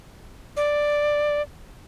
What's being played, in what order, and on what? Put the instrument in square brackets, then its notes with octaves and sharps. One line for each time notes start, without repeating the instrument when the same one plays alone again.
[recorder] D5